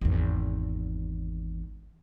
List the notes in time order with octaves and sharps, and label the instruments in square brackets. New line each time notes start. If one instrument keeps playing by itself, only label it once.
[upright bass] G#1 E2